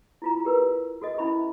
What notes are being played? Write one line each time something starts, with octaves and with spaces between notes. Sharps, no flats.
E4 F4 A#5
G4 A#4 B4
F#4 A4 D#5
C#4 E4 E5 B5 C#6